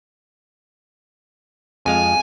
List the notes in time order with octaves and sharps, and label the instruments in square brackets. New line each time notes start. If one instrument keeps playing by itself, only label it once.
[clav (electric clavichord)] F2 G#3 F5 [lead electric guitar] G#5